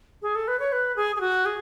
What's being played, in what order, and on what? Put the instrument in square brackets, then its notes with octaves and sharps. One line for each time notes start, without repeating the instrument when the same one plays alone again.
[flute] G#4
A4
B4
C#5
B4
G#4
G#4
F#4
G#4